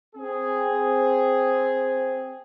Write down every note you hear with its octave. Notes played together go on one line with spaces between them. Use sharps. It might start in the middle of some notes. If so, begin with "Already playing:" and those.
C4 G#4